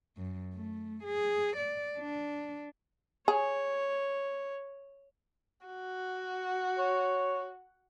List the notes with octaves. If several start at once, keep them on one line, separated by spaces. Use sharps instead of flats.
F#2
A3
G#4
D5
D4
G#4 C#5
F#4
C#5